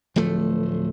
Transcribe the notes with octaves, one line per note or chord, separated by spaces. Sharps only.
D1 F3 A3